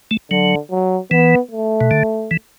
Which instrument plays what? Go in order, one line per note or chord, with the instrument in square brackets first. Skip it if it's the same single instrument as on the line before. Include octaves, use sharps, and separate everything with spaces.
[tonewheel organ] A3
[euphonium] D3 [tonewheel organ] F#3
[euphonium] F#3
[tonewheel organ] E3 [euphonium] B3
[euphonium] A3
[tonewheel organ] B2
D3
E3